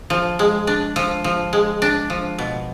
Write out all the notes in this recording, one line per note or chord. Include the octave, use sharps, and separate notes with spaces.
F3
G#3
D4
F3
F3
G#3
D4
F3
B2